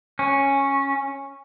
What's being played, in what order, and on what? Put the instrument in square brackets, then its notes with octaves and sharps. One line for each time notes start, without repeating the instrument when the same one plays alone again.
[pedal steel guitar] C#4